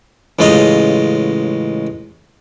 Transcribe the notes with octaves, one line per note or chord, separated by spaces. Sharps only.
A1 C#3 G#3 F4 D#5